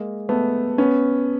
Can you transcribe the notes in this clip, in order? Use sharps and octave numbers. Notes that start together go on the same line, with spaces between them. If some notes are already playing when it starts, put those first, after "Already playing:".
Already playing: G#3 A#3
A3 B3
B3 C#4